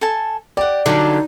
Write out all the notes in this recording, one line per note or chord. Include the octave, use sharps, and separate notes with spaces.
A4 G#5 A5
G4 D5 F#5
D3 F#3 D#4 G4 F5